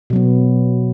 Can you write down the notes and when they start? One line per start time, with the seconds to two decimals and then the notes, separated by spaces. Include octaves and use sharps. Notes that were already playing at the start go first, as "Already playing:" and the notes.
0.10 B2
0.13 F#3
0.16 B3